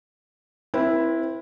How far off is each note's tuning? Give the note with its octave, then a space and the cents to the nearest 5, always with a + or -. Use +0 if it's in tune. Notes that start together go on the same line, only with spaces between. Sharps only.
C4 +0 E4 +0 B4 -45